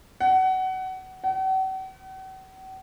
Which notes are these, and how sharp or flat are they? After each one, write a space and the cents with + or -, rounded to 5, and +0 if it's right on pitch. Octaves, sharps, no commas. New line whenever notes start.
F#5 +25
F#5 +45